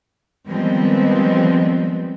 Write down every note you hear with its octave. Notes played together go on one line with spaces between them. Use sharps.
D#3 F3 G3 G#3 B3 C4